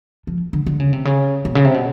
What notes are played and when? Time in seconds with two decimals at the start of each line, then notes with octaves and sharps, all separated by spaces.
0.27 F3
0.53 D3
0.66 D3
0.80 C#3
0.93 C3
1.05 C#3
1.45 B2
1.55 C#3
1.65 C3
1.74 B2